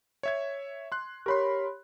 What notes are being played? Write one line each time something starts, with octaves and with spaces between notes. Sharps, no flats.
C#5 E5 G#6
C6 F#6
G4 A#4 C#5 B5 C6